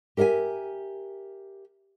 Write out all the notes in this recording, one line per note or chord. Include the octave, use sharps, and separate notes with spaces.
G4 A#4 E5 F#5 G#5